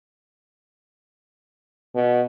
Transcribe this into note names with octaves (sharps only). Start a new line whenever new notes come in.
B2